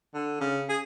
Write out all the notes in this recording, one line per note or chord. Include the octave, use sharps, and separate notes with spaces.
D3
C#3
G#4